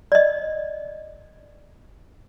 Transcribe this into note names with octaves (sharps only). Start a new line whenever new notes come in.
D5 D#5